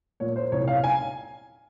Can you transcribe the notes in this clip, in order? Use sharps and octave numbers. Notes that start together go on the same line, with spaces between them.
A#2 C#5
C5
C2 C#5
F5
G#5